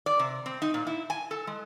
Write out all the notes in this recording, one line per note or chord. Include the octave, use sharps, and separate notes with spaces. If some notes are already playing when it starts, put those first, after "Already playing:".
D5
C3
C4
D#4
A#2
E4
G#5
A4
G#3